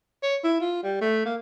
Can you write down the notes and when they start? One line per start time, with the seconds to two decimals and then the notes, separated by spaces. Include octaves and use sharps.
0.23 C#5
0.44 E4
0.60 F4
0.83 G3
1.01 A3
1.25 A#3